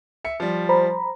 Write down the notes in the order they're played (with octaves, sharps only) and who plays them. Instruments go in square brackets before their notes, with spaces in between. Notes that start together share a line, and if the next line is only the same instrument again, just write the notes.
[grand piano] E5 C#7
F3 G3
[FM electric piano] C5 A#5 B5